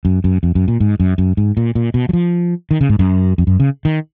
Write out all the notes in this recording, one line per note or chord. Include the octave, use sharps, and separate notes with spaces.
F#2
F#2
F2
F#2
A#2
G#2
F#2
F#2
G#2
A#2
A#2
B2
F#3
F3
D#3
C#3
G#2
F#2
F2
F#2
C#3
D#3